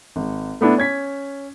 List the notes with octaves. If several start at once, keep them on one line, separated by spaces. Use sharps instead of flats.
G#1
A3 B3 D4 E4
C#4 G#6 B6